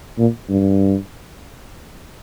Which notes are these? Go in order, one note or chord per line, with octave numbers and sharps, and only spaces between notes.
A#2
G2